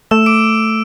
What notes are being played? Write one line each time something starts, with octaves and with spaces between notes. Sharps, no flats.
A3 E6 E7
D6 D7